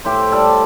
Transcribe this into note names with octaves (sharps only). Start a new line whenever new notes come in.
A2 G4 C5
G3 A4 D5